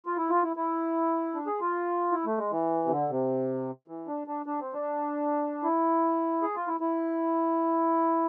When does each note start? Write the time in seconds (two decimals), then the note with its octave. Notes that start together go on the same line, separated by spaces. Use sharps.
0.06 F4
0.17 E4
0.30 F4
0.43 E4
0.56 E4
1.35 D4
1.46 G#4
1.60 F4
2.12 E4
2.26 A3
2.38 G#3
2.51 E3
2.85 C3
2.90 D3
3.10 C3
3.88 E3
4.07 D4
4.27 D4
4.46 D4
4.60 C4
4.74 D4
5.63 E4
6.42 G#4
6.55 F4
6.67 E4
6.80 E4